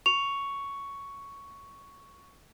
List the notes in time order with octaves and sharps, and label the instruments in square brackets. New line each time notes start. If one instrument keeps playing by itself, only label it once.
[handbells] C#6 [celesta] F7